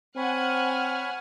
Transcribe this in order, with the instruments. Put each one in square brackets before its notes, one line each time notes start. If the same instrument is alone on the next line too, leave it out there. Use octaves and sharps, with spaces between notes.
[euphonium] C4 [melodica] C#5 B5 [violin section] F#5 G#5 [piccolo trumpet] F6